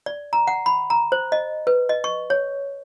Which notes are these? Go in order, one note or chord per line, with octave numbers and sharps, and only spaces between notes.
D5
A#5
F#5
B5
A#5
C5
D#5
B4
D#5
C#6
C#5